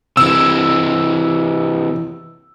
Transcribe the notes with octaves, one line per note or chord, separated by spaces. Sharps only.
C3 E3 E6